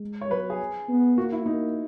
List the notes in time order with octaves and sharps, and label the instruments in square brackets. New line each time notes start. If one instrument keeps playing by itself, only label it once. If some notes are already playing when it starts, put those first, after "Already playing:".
Already playing: [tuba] G#3
[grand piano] C#5
[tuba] F#3 [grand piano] B4
[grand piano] G#4
[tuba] B3
[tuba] A#3 [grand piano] F#4
[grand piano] E4
[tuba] A#3 [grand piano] D#4